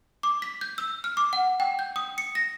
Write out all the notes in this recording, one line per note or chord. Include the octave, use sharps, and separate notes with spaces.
D6
B6
G6
E6
F6
D6
F#5
G5
G6
D#6
C#7
A#6